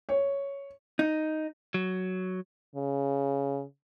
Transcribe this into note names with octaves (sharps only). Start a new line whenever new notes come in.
C#5
D#4
F#3
C#3